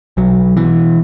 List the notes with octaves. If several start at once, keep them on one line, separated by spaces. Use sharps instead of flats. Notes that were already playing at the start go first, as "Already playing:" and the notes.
B1 F#3
B2 E3